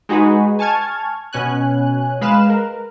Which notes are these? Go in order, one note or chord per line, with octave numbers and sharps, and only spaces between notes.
G#3 D#4 F#4 G#4 B4
G#5 A5 C#6 F6 G#6
B2 C#4 G#5 F#6
G#3 B4 F5 F#6 E7
A#4